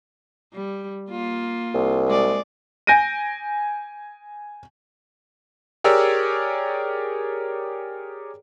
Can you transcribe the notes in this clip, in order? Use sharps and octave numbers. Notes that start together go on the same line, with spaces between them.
G3
A#3 F4
C2
G#3 D5
G#5 G6 A#6 D7 D#7
G4 G#4 A#4 C#5 D5 E6